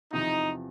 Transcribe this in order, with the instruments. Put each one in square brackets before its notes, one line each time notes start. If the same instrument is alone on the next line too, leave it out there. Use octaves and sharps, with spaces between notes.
[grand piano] E2 C3 F3 [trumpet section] D#4